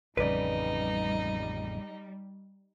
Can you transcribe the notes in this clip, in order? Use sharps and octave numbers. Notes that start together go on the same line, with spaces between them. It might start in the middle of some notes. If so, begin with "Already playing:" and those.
A1 F2 C#3 G3 D#4 B4 D5